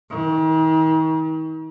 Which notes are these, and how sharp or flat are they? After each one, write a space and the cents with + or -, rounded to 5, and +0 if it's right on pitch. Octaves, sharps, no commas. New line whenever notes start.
D#3 +40